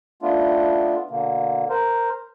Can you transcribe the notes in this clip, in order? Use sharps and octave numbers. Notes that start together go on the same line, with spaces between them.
A3 B3 D4 F4
B2 D3 A#3
A#4 C5